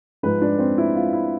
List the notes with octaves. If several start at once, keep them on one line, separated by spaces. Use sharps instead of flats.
G#2 F3 B4
D4
C4
E4
F4
E4